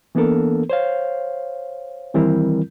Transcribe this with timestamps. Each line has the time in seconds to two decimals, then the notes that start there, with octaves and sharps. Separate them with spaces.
0.15 E3 A#3 B3 D4 A4 A#4
0.70 C5 C#5 F5
2.14 D#3 E3 G3 C4 E4 A#4